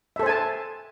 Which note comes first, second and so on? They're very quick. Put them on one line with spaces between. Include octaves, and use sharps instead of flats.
E5 A4 C5 G#5 A5